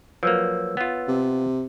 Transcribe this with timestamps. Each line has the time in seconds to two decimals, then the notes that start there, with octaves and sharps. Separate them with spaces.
0.23 F3 F#3 A#3 B4 C#5 E6
0.77 B3 F4
1.08 C3